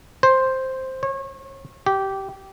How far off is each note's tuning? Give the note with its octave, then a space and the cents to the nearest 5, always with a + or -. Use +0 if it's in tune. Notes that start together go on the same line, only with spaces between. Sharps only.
C5 +5
C#5 -30
G4 -15